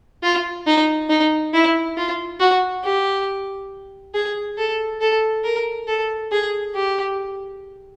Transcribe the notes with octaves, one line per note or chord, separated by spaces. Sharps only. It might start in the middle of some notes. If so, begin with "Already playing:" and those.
F4
D#4
D#4
E4
F4
F#4
G4
G#4
A4
A4
A#4
A4
G#4
G4